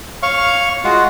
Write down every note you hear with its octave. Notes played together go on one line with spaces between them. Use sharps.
C#5 F5 C#6
G#3 F4 F#4